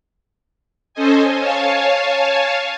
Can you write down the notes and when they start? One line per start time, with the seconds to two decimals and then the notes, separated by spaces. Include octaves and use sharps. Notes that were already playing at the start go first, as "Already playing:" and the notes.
0.94 C#4 A4 C5 D#5 G#5
1.38 C#5 F5 G#5 A5